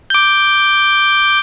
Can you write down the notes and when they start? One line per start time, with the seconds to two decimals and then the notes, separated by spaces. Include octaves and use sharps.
0.10 D6 G6